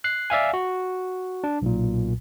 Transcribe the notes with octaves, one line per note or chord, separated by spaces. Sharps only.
F#6 C7
D5 E5 F5 G#5
F#4
D4
B1 A#2